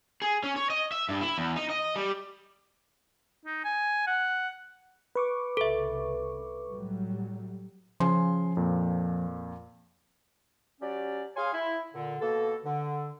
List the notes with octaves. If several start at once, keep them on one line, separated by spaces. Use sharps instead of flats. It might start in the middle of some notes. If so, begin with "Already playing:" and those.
G#4
C#4
C#5
D#5
E5
G2
E4
E2
D#4
D#5
G3
D#4
G#5
F#5
B4 C#6 D6
C2 C#3 A4 E5
A2 F#3 G3
C#3 F3 G#5 C6
F2 A#2
F#3 C#4 G4 D5
G#4 C#5 F5 G#5 C6
E4
A#2 D3
B2 A#3 A4
D3